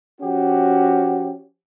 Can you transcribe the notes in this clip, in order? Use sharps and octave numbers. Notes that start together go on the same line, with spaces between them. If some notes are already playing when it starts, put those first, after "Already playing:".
F3 C#4 F#4 G4